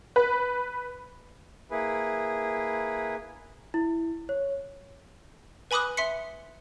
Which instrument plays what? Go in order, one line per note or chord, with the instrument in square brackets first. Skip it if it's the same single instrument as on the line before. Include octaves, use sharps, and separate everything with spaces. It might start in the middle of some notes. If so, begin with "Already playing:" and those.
[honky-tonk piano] B4
[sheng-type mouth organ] A#3 E4 G#4 B4
[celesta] E4
C#5
[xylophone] B4 G#5 B5 D6 D#6 F#6
E5 C6 B6 C#7